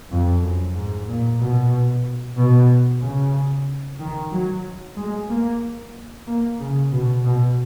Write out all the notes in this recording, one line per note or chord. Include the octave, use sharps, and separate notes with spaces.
F2
F#2
G#2
A#2
B2
B2
C#3
D#3
F#3
G#3
A#3
A#3
C#3
B2
B2